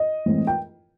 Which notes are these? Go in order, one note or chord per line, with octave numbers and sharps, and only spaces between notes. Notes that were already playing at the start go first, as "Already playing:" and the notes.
Already playing: D#5
A2 E3 G#3 C4
G5